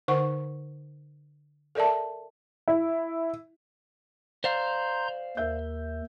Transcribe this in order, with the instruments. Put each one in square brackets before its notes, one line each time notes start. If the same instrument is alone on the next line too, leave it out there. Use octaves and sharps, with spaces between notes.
[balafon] D3 D#4 A#4 C5 F#5 C#6
A4 A#4 D5 E5 A5
[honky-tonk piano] E4
[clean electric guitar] C5 D5 F5 [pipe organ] A#5 C6 G6
[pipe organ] D#2 [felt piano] A#4 E5 G6